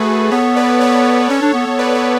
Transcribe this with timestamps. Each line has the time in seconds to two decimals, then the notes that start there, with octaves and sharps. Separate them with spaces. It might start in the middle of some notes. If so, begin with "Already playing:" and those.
Already playing: A3 F#4 G#4 A4 B4
0.31 B3 A4 C#5
0.56 B4 D5
0.81 A4 C#5
1.30 C#4 A4 C#5
1.42 D4
1.54 B3
1.66 B3
1.79 B4 D5
1.95 A4 C#5